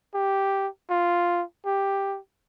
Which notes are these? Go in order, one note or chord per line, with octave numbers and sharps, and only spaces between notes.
G4
F4
G4